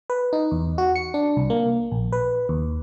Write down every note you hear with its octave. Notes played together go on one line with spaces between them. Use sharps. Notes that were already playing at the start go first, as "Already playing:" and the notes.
B4
D#4
E2
F#4
C#7
D4
C2
A#3
A#1
B4
D#2